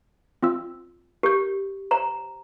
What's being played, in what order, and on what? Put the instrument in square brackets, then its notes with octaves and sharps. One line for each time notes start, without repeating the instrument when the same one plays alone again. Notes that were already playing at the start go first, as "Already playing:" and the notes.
[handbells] C4 F4 E6
[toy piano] G4 [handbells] A#4 G6
[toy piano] C5 A#5